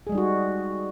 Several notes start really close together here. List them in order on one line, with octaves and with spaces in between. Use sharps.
G#4 G#3 G3 D#4 F#4